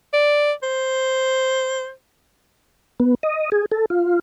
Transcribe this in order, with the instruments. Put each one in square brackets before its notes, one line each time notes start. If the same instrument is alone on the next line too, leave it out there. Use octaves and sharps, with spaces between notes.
[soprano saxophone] D5
C5
[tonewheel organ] B3
D#5
G#4
A4
F4